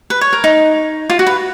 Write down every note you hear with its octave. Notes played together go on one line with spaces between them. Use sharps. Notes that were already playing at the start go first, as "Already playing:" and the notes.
B4
C#5
A#4
D#4
F4
F#4
B4